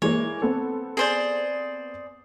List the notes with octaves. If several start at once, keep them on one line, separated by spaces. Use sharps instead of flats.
E3 G#3 A#3 C#5
B3 C4 A4
G#4 C5 D5